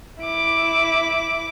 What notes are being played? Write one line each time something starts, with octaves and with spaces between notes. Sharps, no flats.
E4 D6